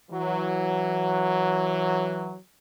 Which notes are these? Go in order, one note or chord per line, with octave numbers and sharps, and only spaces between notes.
E3 F#3